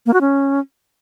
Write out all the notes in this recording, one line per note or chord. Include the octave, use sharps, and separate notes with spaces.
A#3
F#4
C#4